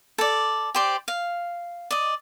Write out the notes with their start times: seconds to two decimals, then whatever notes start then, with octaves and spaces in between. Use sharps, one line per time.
0.18 A4 D5
0.75 G4 C5 D5
1.08 F5
1.91 D5 D#5